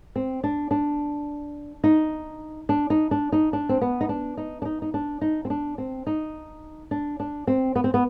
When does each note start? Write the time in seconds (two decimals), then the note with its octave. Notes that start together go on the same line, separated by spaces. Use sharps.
0.16 C4
0.44 D4
0.71 D4
1.84 D#4
2.69 D4
2.90 D#4
3.11 D4
3.32 D#4
3.53 D4
3.69 C4
3.81 B3
4.01 D#4
4.09 D4
4.37 D#4
4.62 D4
4.65 D#4
4.82 D#4
4.94 D4
5.21 D#4
5.45 C4
5.50 D4
5.78 C4
6.07 D#4
6.91 D4
7.20 D4
7.47 C4
7.75 B3
7.84 C4
7.94 B3